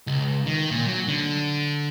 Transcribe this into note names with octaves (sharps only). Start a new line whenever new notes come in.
C#2
D#3
A#2
F#3
D3